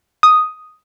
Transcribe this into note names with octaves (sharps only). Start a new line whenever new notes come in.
D#6